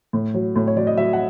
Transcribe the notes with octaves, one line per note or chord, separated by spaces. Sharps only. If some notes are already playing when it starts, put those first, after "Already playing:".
A2
F#3
A2
C#5
F#3 D5
D#5
F#3 E5
F#5